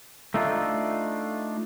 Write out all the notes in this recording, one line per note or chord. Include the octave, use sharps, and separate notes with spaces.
A3 D4 D#4 F4